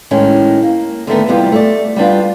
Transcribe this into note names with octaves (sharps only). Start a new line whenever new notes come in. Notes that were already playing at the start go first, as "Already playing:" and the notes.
A2 D#3 G#3 C#4
A#3
D3 D#3 A3 B3
E2 C3 G3 B3 F4 G4
A3 D5
G3 B3 D4 F4